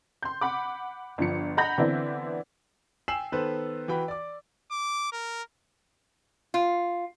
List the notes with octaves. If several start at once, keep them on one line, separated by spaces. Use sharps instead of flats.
C6 G6
F#5 B5 D6
G1 F3 C#7
D#5 F#5 A#5 B5 G6 A#6
D3 E3 B3 C4 D4 E4
G5 G#5 E6 C7 E7 F#7
D#3 B3 A4 B4 C5
E3 F#4 G5 B5
D5 D6
D6
A#4
F4